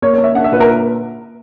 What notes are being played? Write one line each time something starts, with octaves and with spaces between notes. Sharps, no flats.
A#3 C#5
A#3 C#5
E5
D4 F#5
E5
A#2 B4
A#4